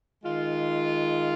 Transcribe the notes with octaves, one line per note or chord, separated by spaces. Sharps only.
D#3 G#3 F4